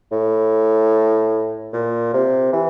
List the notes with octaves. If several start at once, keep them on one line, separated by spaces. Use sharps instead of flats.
A2
A#2
C3
E3